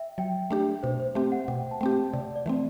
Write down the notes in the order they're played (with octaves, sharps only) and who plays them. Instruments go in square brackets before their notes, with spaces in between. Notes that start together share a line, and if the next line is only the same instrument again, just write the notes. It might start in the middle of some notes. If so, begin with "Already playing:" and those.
Already playing: [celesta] E5 G5
[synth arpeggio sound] F#3 [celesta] G5
[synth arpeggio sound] A3 D4 G4
[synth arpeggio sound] B2 [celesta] C5
[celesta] C5
[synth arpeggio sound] A3 C4 G4 [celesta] E5
[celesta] F#5
[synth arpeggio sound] B2 [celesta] G5
[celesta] A5
[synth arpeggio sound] A3 C4 G4 [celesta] G5
[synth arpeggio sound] C3 [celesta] D5
[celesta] D5
[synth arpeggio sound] E3 A3 C4